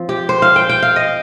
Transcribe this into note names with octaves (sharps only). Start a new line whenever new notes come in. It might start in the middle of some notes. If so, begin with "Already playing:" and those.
Already playing: F3 C4
G4
C5
F5
G5
G5
F5
D#5